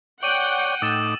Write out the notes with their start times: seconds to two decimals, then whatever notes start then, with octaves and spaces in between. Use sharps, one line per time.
0.23 C#5 D5 F#5 G5 D#7 F#7
0.82 A2 D#4 D6 E6 A6 E7